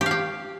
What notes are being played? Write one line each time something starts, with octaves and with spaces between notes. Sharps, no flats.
G4
F5
G4